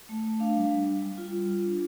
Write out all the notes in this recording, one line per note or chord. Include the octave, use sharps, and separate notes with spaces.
A3
A3
D4 F5
G3
G3
G3
G3
F4
F4
F4
D4